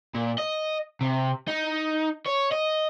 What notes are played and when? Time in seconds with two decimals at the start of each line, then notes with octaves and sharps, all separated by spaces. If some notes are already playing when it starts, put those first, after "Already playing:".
0.15 A#2
0.38 D#5
1.01 C3
1.48 D#4
2.26 C#5
2.52 D#5